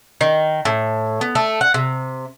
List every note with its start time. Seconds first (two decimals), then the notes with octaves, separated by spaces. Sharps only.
0.21 D#3
0.65 A2
1.21 B3
1.35 A3
1.61 F#5
1.74 C3